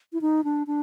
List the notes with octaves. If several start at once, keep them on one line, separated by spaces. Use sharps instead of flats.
E4
D#4
D4
D4